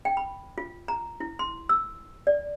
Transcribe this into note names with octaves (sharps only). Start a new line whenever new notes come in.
G5
B5
F4
A#5
E4
C6
E6
D5